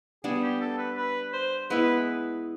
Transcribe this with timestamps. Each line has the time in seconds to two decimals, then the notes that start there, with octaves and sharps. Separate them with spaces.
0.24 G3 B3 D4 G#4
0.43 G4
0.61 A4
0.78 B4
0.97 B4
1.33 C5
1.70 G#3 B3 E4 B4